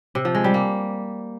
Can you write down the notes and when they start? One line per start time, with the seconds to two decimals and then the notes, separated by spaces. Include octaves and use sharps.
0.15 C3
0.25 F3
0.35 G#3
0.44 G3
0.54 A#3